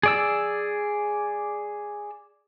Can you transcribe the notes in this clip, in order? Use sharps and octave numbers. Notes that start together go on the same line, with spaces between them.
G#4 D5 E6